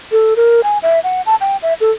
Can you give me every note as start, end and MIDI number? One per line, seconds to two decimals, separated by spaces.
0.12 0.34 69
0.37 0.63 70
0.64 0.78 80
0.83 1.00 76
1.04 1.22 78
1.26 1.35 81
1.41 1.57 79
1.63 1.74 76
1.81 1.91 69